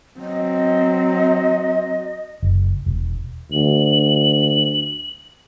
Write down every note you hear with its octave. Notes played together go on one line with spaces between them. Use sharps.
F#3 C4 D#5
F#1
E1
D2 F#7